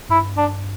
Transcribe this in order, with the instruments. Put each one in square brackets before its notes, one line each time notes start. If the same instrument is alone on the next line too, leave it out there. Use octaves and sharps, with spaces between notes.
[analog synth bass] G2 [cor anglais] E4
[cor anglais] D4